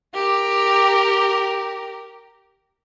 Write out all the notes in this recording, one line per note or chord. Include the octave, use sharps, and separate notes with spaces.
G4 A#4